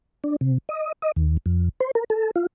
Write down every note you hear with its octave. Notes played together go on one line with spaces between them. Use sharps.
D4
C3
D#5
D#5
D#2
F2
C5
A#4
A4
F4